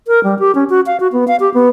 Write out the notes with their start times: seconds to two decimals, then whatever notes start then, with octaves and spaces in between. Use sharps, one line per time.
0.08 A#4
0.24 G3
0.39 G4
0.55 C#4
0.70 F#4
0.86 F5
1.00 F#4
1.13 B3
1.28 F5
1.40 G4
1.54 B3